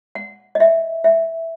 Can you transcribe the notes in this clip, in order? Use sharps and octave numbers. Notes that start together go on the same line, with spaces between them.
F#5
D#5
E5
E5